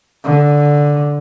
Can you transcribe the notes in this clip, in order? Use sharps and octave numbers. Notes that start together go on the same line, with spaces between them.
D3